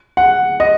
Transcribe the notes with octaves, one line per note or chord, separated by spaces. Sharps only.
F#5
D#5